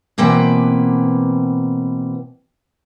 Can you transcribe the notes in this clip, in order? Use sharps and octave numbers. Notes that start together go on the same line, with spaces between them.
B2 E3 A#3 C4 B4 G5